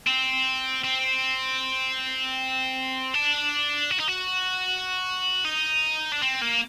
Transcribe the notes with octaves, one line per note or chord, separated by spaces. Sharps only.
C4
C4
D4
F#4
D#4
F#4
D#4
D4
C4
A#3